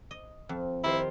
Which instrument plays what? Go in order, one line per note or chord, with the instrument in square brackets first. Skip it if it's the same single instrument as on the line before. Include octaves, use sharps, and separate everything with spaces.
[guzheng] D#5
F2
[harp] D#3 G4 C5 [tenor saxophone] E4